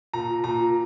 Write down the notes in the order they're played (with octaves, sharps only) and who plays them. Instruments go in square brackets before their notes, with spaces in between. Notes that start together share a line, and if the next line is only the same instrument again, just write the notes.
[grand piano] A#2 A#5
A#2 A#5